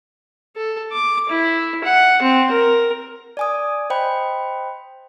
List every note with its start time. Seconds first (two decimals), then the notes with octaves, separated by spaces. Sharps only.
0.56 A4
0.92 D6
1.29 E4
1.84 F#5
2.22 C4
2.51 A#4
3.37 D5 G#5 D#6
3.90 C5 D#5 G5 B5